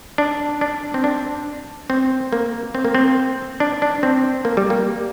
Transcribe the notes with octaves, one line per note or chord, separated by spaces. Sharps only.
D4
D4
C4
D4
C4
A#3
C4
A#3
C4
D4
D4
C4
A#3
G3
A#3